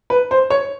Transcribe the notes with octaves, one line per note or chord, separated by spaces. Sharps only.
B4
C5
C#5